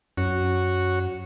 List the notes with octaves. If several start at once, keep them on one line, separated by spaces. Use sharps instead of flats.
F#2 F#4 C#5